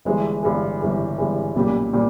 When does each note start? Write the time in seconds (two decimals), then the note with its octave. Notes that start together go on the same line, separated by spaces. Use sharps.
0.05 G1 G2 E3 G#3
0.43 G1 G2 E3 G#3
0.80 G1 G2 E3 G#3
1.18 G1 G2 E3 G#3
1.55 B1 A#2 G3 C#4 G4
1.93 A#2 G3